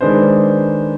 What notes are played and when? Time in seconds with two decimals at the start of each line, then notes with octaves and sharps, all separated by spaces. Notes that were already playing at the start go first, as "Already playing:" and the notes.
0.01 D#3 G#3 D4 B4 C5